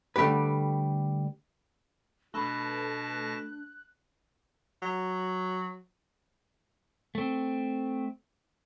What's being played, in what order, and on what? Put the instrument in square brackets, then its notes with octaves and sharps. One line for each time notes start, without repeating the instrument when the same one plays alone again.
[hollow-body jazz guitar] D3 G3 A3 G4 B4
[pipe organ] B2 A5 A#6 [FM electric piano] A3 A4 B4 [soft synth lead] D4 [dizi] F#6
[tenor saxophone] F#3
[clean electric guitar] A3 C4